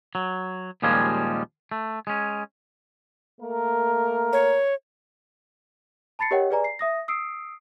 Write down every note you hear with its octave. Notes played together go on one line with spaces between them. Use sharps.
F#3
D#2 A#2 F3 G3 G#3 C#4
A3
G#3 C#4
A3 A#3 A#4
C#5
A5 B5 A6 C7 C#7
G4 A#4 C#5 D#5 F#5 G5
G#4 B4 D5 G#5 A#5
C7
E5 D#6 A#6
D#6 E6 C7 D7